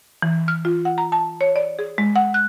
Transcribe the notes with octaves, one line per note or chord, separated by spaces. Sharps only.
E3
F6
F4
F#5
A#5
A5
C#5
D5
G#4
G#3
F#5
F#6